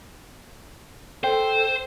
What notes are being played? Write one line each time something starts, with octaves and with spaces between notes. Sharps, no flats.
A4 C5 G5